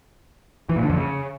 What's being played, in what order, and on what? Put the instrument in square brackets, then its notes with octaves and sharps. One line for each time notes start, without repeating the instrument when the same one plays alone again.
[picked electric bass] E3
A#2
D3
F2
C#3